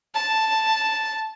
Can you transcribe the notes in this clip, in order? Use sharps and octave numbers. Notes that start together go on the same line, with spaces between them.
A5